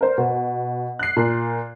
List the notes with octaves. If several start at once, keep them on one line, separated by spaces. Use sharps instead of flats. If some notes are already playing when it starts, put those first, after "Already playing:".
A#4 C5
B2
F#6 C7
A#2